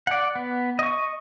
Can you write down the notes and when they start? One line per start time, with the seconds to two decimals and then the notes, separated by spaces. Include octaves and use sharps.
0.07 D5 F#5
0.36 B3
0.79 D#5 C#6